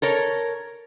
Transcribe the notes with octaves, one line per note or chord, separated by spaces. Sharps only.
A4 A#4 C#5